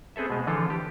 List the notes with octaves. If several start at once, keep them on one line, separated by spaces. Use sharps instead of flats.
B3 C4 G#4 A4 E5
B2 G#3
D3 E3 F3 F4 A4
G4